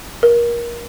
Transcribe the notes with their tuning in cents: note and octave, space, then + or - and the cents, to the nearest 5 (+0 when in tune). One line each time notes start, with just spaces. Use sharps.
A#4 +25